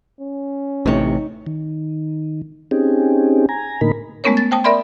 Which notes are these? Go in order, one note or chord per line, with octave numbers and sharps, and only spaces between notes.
C#4
A1 A2 C3 D#4 C#5
D#3
C4 C#4 D#4 G4 G#4
G#5 A#5
A2 D3 A#3 D#4 A#4 B5
G#3 A3 B3 C#4 A#4 C#5
A6
C5 G5 A5 D#6
A#4 D5 E5 B5 C6